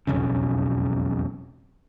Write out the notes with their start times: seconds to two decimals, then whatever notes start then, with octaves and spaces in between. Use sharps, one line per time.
0.07 E1 B1 F2 C#3